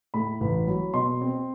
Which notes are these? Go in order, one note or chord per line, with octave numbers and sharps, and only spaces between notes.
A2 B5
A1
F#3
B2 C6
C4